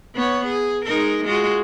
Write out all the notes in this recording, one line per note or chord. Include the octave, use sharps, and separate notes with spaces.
B3 C#5
G#4
G#3 D#4 A#4
G#3 F4 F#4